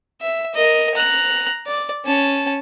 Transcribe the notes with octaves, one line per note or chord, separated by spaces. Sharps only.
E5
A#4 D#5
A#5 F#6
D5
C#4 A5